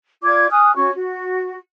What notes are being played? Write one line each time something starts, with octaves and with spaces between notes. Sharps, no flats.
F4 D5 D6 G#6
G#5 D#6 F6 F#6
C#4 F#4 C#5 C#6
F#4